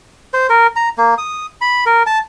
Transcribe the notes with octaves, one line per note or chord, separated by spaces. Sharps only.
C5
A#4
A#5
A#3
D#6
B5
A#4
A5